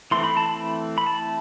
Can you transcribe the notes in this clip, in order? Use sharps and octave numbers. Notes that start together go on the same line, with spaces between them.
E3 A3 C4 C6
B5
A5
B5
B5
A5